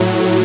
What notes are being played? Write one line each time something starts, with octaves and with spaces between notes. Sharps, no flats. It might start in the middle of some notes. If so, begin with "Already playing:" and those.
Already playing: A2 F#3